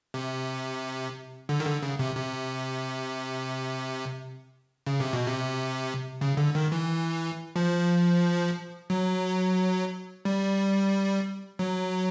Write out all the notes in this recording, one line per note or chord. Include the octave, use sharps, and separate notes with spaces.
C3
D3
D#3
D3
C#3
C3
C3
C#3
C3
B2
C3
C#3
D3
D#3
E3
F3
F#3
G3
F#3